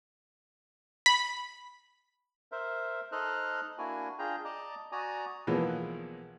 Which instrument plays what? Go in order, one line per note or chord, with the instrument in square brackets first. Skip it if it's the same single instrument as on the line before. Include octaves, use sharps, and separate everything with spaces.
[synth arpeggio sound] B5
[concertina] A#4 C5 E5
D#4 A4 C5 D#5 F6 F#6
A#3 D4 E4 F#4 G#5
D4 F4 G#4 G5 A#5
D5 D#5 A5 A#5 D6
F#4 D5 G#5 A#5 D#6
[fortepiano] B1 E3 F3 G#3 A#3 B3